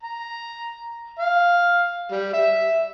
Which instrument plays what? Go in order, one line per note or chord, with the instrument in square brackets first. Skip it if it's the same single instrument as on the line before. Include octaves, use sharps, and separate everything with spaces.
[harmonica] A#5
F5
G3
E5